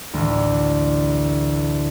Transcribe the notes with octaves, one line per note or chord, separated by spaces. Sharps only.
A1 D2